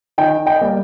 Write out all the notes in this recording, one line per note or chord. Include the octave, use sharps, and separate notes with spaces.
D#3 D#5 G5
D#5 G5
G3 A#3